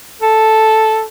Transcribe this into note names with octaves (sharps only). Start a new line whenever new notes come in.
A4